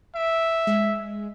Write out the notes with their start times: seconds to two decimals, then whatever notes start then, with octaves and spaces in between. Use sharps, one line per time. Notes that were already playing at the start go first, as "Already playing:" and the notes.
0.15 E5 D7
0.67 G#3